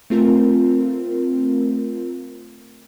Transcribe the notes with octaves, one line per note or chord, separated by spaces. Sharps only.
A3 C4 F4 A#4